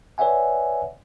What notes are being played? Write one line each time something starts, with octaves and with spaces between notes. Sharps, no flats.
B4 C#5 D5 E5 F#5 G#5